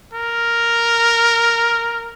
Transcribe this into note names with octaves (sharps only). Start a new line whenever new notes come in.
A#4